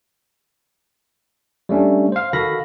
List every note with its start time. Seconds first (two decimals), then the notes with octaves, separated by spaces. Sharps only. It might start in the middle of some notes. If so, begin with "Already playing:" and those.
1.69 G3 A3 C#4 D4
2.12 C5 F5
2.33 D#3 F#4 A4 F5 B5 A#6